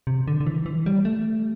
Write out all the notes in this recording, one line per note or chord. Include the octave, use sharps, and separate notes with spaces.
C3
D3
D3
E3
E3
G3
A3